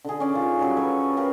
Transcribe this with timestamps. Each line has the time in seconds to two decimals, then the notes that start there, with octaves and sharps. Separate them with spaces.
0.05 D3 G#4
0.20 C#4 D5
0.34 D#3 F4
0.59 F#3 G3 C#4
0.77 A4 B4 C#5
1.17 G4 A#4 B4 F5